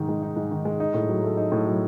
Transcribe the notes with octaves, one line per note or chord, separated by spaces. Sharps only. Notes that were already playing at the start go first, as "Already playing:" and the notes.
Already playing: G#2 D#3 D#4
G#3
D#4
G#2
D#3
G#3
D#4
A2
F#3
A3
D#4
A2
F#3